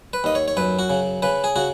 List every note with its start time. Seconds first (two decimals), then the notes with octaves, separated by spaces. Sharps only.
0.13 B4
0.24 D#2 D#5
0.35 C#5
0.48 C#5
0.57 F#2 B4
0.79 F#4
0.90 C#3
1.22 C#3 B4
1.44 G#4
1.56 C#3 F#4